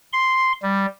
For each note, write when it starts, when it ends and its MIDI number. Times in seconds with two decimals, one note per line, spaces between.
0.13 0.52 84
0.63 0.86 55